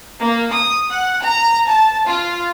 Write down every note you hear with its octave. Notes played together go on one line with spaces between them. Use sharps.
A#3
D#6
F#5
A#5
A5
F4